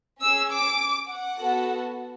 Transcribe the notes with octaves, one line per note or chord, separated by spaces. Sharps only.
C#4 G#4 E6
D6
F#5
B3 F#4 A4